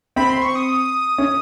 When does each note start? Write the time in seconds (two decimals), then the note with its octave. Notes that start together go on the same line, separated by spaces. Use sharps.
0.16 C4 B5
0.30 C6
0.42 C#6
0.55 D#6
1.18 C#4